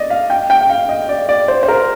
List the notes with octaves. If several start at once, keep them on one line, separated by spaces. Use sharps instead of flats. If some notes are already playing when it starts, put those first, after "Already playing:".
Already playing: D5 D#5
F5
G5
G5
F5
D#5
D5
D5
C5
C5
A#4